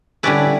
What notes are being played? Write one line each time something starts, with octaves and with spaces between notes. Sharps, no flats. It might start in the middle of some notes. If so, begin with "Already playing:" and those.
D3 G3 C#4 E4 B4 D5